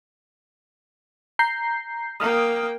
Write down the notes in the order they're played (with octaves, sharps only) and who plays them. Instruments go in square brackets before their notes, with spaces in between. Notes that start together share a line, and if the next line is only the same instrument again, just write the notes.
[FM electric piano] A#5 G6 C7
[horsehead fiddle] A#3 G5 [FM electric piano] D#6 F6